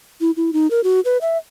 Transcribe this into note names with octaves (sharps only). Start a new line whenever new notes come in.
E4
E4
D#4
A#4
F#4
B4
E5